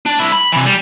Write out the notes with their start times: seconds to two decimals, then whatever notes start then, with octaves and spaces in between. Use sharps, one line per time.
0.06 D4
0.20 C2 E4
0.32 B5
0.52 C3 E3
0.65 G3